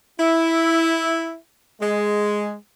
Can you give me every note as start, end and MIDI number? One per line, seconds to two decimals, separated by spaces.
0.20 1.36 64
1.81 2.53 56